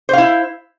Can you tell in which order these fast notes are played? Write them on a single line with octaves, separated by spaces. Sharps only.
C5 F5 E4